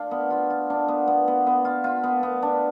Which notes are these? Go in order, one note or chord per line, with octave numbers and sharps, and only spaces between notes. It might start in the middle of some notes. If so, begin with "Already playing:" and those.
Already playing: D4 F4
B3
F4
F4
D4
B3
B3
B3
B3
F4
F4
B3
B3
D4